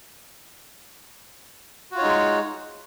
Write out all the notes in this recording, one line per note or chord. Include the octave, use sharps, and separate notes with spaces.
G#3 D#4 F4 F#4 C#5